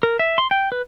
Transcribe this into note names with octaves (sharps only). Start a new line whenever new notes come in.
A#4
E5
C6
G5
B4